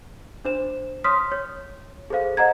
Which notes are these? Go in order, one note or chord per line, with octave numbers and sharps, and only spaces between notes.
D4 C5 E7
C#5 C6 D#6 F6 B6
C#5
G#4 A4 C5 F5
C5 D#5 F#5 A#5 G#6